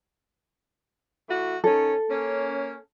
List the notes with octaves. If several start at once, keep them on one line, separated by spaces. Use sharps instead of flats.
E3 A3 F#4
D#3 C#4 A4
A#3 C#4